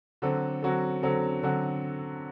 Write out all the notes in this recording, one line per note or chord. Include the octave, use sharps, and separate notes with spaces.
D3 F#3 C4 F#4 A4
D3 F#3 C4 F#4 A4
D3 F#3 C4 F#4 A4
D3 F#3 C4 F#4 A4